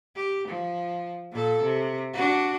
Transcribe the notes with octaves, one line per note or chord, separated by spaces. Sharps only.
G4
F3
A#2 A4
C3
D4 F#4